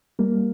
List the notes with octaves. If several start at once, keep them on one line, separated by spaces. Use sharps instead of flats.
G3 A#3